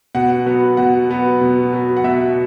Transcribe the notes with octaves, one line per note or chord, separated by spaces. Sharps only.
B2 F#5
F#3 B3
B2 F#5
F#3 B3
B2
F#3 B3
F#5
B2 E5